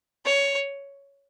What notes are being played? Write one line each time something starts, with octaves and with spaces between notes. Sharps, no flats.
C#5